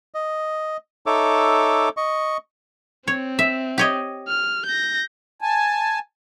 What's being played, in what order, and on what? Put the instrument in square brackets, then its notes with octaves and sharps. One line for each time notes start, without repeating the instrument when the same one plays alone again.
[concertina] D#5
D#4 A4 C#5 E5 D6
D#5 C#6
[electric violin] C4 [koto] C#5
[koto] E5
G4 C#5 D#5
[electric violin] F6
G6 A#6
[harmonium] G#5 A5